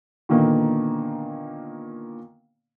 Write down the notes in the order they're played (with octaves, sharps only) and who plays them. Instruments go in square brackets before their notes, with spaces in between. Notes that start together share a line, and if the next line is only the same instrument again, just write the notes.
[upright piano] A#2 D3 D#3 A#3 B3